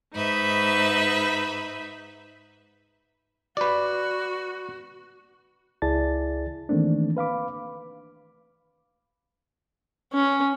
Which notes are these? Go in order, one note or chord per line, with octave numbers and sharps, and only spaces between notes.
G#2 D#4 B4 E5
F#4 B4 D5
C#2 E4 G#4 D5 A5 A6
D#3 E3 A3 A#3 C4 D4
B4 F5 B5 D6
C#4